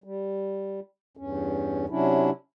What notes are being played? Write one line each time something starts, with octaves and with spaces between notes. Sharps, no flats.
G3
E2 G2 C#4
C3 F#3 C#4 D4 E4